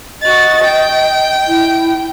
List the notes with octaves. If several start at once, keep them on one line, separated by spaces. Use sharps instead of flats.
F#4 D#5 A6
G5
E4